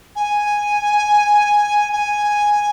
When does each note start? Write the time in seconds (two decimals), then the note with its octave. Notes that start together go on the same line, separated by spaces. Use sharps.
0.15 G#5
1.92 G#5